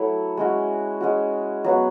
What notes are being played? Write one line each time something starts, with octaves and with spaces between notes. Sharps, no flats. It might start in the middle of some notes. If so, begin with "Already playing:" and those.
Already playing: F#3 A3 E4
G#3 C#4 F#4
G#3 C#4 F#4
F#3 B3 F#4